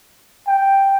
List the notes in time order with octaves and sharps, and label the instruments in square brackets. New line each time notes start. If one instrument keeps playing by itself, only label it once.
[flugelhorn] G5